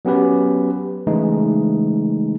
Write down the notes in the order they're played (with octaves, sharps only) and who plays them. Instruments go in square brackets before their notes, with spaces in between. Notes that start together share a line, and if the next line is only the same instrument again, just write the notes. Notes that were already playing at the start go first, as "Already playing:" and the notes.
[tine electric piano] F#3 B3 C#4 G4 B4
C#3 E3 G#3 A3 D#4 E4